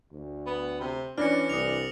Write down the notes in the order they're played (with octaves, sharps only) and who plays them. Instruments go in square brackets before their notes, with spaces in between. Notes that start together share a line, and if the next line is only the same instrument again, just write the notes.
[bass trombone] D2
[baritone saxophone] B3
C3
[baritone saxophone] E3 [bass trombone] C#4 [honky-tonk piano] D4 [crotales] F6 A#6 C#7
[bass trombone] C2 [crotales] D#6 C#7 F7